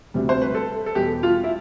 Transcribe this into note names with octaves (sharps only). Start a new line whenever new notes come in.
D2 C3 G3
C5
B4
A4
A4
E2 B2 G3 G4
F4
E4